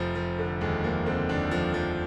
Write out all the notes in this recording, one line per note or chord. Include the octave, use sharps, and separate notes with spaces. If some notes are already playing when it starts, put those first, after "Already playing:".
Already playing: F1 F3
F3
D3
D#2 G#3
F3 A#3
D3 C4
D#2 D4
F3
F3